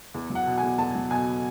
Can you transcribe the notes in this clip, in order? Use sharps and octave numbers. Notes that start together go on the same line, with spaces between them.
E2
F#3
F#5
B2
G#5
E2
E2 A5
F#3
B2 G#5